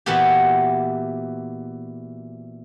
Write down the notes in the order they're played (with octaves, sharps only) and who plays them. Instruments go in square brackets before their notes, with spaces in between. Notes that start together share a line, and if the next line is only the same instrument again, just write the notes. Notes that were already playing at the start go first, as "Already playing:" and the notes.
[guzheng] A#2 E3 B3 E4 F#4 G4